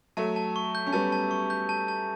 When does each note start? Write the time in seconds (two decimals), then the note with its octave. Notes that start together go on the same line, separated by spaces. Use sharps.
0.17 F#3 A3 A5
0.36 A5
0.56 C#6
0.75 G6
0.87 C#4
0.93 G3 B3 A5
1.12 A5
1.31 C#6
1.50 G6
1.69 A5
1.88 A5